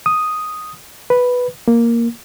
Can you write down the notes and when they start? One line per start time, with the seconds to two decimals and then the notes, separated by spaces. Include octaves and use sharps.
0.06 D#6
1.10 B4
1.68 A#3